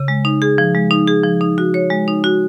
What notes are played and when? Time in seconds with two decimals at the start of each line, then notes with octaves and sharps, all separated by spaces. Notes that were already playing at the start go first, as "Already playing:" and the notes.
Already playing: C#3
0.08 G#3
0.25 D#4
0.42 G#4
0.58 F3
0.75 G#3
0.91 D#4
1.07 G#4
1.24 F3
1.41 D#4
1.58 F#4
1.74 C#5
1.90 G#3
2.08 D#4
2.24 F#4